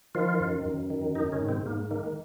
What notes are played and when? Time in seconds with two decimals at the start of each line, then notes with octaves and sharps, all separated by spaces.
0.15 D#3 F3 F4
0.40 F#2
0.65 F#2
0.90 D#3
1.15 D#3 D#4
1.32 C#3 C#4
1.40 G#2
1.49 C3 C4
1.66 G#2 A#3
1.91 D#3 A#3